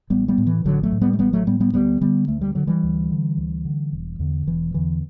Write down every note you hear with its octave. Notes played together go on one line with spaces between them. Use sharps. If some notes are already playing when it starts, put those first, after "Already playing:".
A1 G3 B3
G3 B3
A2
E3
A1 D3 F#3
F#3 A3
A2
G3 B3
A3
A1 G3 B3
F#3 A3
A2 G3 B3
G3 B3
D2 G3 B3
D3 G3 B3
D2 A3
G3
D3 F#3
E3 G3
D2
D3
D2
D3
E1
E2 D3
E1 E3
E2 D3 E3